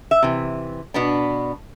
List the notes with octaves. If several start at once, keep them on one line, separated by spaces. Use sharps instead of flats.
E5
C3 E3
B2 B3 D4